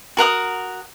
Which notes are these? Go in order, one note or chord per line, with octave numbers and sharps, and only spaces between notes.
F#4 A#4 F#5 D#6